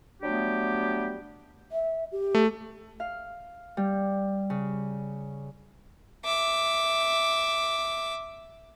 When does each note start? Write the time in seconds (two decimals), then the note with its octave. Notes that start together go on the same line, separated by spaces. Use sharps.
0.22 F#3 G3 A3 B3 D4 G4
1.72 E5
2.12 G4
2.35 A3
3.00 F5
3.77 G3
4.50 C#3
6.25 E5 D6